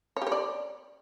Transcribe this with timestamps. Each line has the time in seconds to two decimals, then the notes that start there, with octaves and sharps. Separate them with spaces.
0.17 C#5
0.22 G4
0.27 C#5
0.32 D5